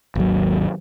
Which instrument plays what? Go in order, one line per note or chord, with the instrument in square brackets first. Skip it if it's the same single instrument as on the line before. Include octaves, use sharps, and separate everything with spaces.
[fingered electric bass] G#1 D#2 F#3